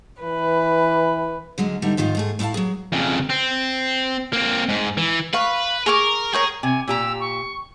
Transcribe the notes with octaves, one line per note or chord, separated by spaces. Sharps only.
E3 B4
D3 F#3 G#3 C#4
D3 G3 B3 D#4 E4
G#2 D#3 F3 F4
G#2 A3 G#4
A2 E4 D#5 F5 A5
F#3 G#4
F2 C#3
C4
A#3 C4
G#2
E3
B4 F5 C#6
G#4 A#4 C#6 D6
G#4 A#4 C#5 G5
C3 G#5
A#2 G4 A#5 E6
C#6